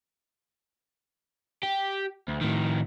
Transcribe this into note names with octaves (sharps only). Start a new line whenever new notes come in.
G4
D2
A2 D#3